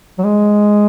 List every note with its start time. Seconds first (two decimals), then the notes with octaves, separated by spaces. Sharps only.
0.19 F#3
0.24 G#3